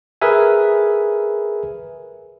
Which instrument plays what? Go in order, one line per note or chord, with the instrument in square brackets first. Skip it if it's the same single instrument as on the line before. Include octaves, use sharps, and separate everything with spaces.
[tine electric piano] G#4 A#4 B4 E5 G#5